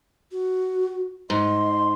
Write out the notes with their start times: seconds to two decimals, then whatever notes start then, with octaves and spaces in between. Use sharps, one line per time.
0.32 F#4
1.30 G#2 D#5 C6